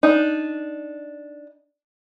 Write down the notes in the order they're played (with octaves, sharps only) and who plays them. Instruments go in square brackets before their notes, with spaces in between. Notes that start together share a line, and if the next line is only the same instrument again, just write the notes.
[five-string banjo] D4 D#4